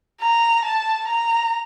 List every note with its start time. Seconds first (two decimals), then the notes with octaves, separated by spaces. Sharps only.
0.21 A#5
0.65 A5
1.08 A#5